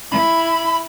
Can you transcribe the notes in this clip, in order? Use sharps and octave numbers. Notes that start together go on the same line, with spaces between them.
E4 B5